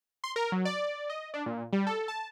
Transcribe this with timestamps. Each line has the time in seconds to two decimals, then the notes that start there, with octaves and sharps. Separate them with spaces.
0.24 C6
0.36 A#4
0.52 F#3
0.65 D5
1.10 D#5
1.34 D4
1.46 A#2
1.73 G3
1.87 A4
2.08 A5